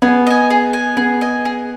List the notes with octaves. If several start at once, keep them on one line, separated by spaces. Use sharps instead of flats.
B3 G#4
D#5 G#5
G#4
D#5 G#5
B3 G#4
D#5 G#5
G#4